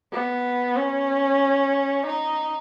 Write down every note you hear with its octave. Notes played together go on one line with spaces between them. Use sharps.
B3
C#4
D#4